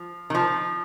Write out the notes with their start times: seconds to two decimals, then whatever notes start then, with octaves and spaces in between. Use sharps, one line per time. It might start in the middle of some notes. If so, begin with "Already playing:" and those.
Already playing: F3
0.30 D#3
0.35 F3